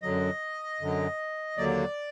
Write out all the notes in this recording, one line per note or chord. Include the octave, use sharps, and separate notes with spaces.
F#2 D3 F#3 D#5
F#2 D3 F#3
D#2 D3 F#3 A#3 D5